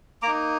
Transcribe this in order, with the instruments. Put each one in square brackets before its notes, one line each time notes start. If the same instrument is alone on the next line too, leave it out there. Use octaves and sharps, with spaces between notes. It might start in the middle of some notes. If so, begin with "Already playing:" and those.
[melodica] A#3 D#4 A#5 D6